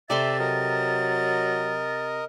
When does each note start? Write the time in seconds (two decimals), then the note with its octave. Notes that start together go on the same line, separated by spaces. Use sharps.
0.10 C3 A4 D5 E5 C6 A6
0.39 F#3 A#4 D#5